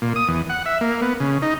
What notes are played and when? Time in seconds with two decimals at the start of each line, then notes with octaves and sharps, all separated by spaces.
0.02 A#2
0.16 D#6
0.28 E2
0.50 F#5
0.66 E5
0.81 A#3
1.02 B3
1.20 C#3
1.42 D#4